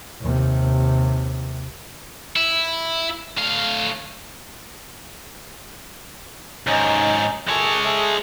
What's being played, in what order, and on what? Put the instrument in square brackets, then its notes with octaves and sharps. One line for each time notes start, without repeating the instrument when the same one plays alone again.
[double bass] D#2 C3
[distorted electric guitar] E4
A2 F5
[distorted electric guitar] D#2 G#2 [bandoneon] C#4 D#4
[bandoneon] F#2 A4 G#5 [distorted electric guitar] G#3 C#5
[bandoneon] G#4 A4 E5